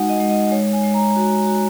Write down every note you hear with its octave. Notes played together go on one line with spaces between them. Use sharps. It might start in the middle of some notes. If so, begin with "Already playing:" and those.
Already playing: G#3 D#4 F#4 F#5 G#5
D#5
G#3
D#5
G#3 C#5
G#5
G#3
A#5
F#4
F#4